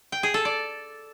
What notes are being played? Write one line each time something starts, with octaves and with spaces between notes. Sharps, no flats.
G5
G#4
A4
D5